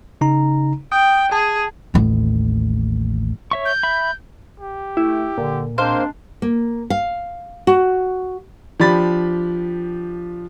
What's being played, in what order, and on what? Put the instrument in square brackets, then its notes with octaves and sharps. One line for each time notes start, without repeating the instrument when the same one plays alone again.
[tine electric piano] C#3 D#4 A#5
[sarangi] G5 [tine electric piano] D#6
[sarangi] G#4 [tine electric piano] A5
[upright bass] A1 D#2
[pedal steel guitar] C#5 E5 C#6
[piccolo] G6
[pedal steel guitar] E5 B5
[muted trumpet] G4
[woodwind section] A3 [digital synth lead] E4
[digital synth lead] A#2 [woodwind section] D3
[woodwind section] G#3 C4 D4 [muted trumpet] A#3 [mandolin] C5 F5
[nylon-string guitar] A#3
F5
F#4
[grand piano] F3 D4 G4 B5 A6